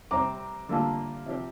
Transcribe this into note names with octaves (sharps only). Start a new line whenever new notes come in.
C3 G3 C4 A#5 D6
D3 G3 A#3 F4 A4
C3 F3 C4 G4